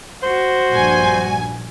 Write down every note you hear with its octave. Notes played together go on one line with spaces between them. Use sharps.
F#4 C5
A#1 G2 G#5